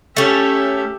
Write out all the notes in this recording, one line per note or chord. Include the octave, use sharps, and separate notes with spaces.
A3 C#4 G4 E5